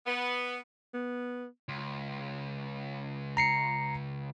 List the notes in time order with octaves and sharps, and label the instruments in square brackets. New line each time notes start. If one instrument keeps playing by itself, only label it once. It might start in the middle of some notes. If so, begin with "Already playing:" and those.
[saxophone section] B3
[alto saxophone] B3
[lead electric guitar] C#2
[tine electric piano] A#5 C7 C#7